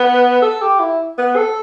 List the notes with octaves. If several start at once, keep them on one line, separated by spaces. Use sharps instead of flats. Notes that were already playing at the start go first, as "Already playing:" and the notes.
Already playing: B3
A4
G4
E4
B3
A4